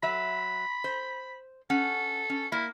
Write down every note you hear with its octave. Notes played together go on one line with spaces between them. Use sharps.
F#3 E5 B5
C5
C#4 A4 F#5
C#4
A#3 E4